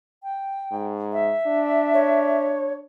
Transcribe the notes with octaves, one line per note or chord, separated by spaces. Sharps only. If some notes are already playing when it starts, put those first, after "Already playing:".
G5
G#2
E5
D4
C#5